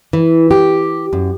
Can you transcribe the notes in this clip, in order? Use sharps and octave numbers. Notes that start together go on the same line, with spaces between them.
E3
G4
F#2